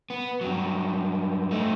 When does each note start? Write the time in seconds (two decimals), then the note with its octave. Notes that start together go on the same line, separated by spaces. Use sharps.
0.10 B3
0.41 G2 F#3
1.51 A3 D#4